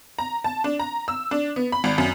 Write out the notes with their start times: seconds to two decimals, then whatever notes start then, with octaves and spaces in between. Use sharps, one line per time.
0.19 A#5
0.44 A5
0.64 D4
0.79 A#5
1.08 E6
1.31 D4
1.56 B3
1.72 B5
1.84 G#1
1.98 F#2